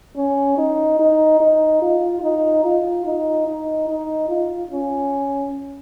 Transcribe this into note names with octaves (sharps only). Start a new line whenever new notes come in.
C#4
D#4
D#4
D#4
F4
D#4
F4
D#4
D#4
D#4
F4
C#4